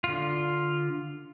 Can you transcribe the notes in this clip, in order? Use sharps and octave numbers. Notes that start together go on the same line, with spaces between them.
D3 F4